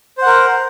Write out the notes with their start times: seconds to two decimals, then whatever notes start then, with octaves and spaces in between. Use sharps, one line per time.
0.18 C5
0.22 F#5
0.26 A#4